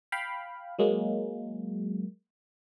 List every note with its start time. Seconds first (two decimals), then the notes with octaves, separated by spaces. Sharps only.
0.12 F5 G5 B5
0.79 F#3 G#3 A#3